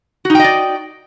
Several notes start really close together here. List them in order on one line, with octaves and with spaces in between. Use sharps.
F#4 D#4 G5 D#5 D5